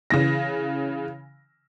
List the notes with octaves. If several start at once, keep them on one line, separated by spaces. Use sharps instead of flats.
C#3 E3 A#6